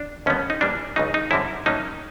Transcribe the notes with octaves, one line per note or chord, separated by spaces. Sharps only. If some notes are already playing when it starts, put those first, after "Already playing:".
Already playing: D4
D#2 D3 G3 B3 C#4
D#4
A2 E3 G3 A#3 D4
C#2 C#3 F#3 D#4
D#4
F#2 D3 G3 C4 E4
A2 F#3 A#3 C#4 D#4